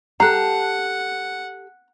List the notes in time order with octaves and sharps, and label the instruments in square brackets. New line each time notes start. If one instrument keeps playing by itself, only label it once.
[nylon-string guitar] G4 A4 [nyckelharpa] F#5 [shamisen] A#5 [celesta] F#6 C7